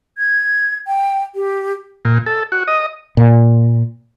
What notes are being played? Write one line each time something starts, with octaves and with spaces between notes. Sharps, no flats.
G#6
G5
G4
A#2
A4
F#4
D#5
A#2